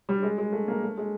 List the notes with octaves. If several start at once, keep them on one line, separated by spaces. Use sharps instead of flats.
G3
G#3
G#3
A3
A#3
A3
G#3